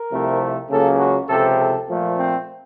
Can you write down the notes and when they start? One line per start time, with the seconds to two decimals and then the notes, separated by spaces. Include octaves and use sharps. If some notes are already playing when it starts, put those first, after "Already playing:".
Already playing: A#4
0.10 C2 C3 F3 A3
0.69 C#2 C#3 F#3 A#3 A4
0.99 F#4
1.28 C#2 C3 F3 A4
1.58 A4
1.87 A#2 F3 A3
2.16 C4